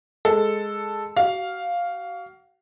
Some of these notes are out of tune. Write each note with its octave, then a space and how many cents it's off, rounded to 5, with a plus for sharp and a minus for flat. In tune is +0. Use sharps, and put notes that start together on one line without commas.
G#3 +0 A4 +0
F#4 +35 F5 +0